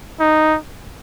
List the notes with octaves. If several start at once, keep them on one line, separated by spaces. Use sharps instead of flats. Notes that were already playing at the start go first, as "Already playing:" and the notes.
D#4